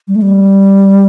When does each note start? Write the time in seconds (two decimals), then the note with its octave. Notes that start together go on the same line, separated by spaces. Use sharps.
0.08 G3
0.15 A3
0.22 G3